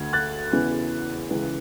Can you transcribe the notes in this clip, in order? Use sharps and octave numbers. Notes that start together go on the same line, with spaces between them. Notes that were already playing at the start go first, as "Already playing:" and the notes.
Already playing: D2 D3 G#6
F#6 A6
E2 C#3 E3
C#2 C#3 E3